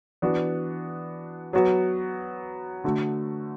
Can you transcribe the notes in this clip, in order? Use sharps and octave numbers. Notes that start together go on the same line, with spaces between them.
E3 B3 D4 F#4
F#3 B3 F#4
D3 A3 F#4